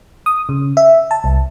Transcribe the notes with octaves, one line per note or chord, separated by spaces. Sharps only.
D#6
C#3
E5
A5
C2